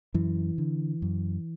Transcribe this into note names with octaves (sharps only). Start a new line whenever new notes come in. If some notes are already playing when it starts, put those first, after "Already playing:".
F#2 E3
D3
F#2